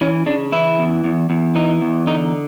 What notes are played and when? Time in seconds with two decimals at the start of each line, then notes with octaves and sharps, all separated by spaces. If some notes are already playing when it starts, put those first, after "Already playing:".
0.01 E3 C#4
0.26 C#3 D4
0.52 E3 E4
0.79 E2
1.04 E2
1.30 E2
1.55 E3 D#4
1.81 E2
2.07 D3 D#4